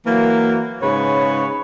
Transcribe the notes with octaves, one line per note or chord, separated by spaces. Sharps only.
E3 F#3 A#3
G#2 C#3 B4 C#5